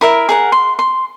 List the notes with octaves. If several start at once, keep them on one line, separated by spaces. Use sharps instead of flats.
E4 A#4 E5
G#4 A#4 F#5
C6
C6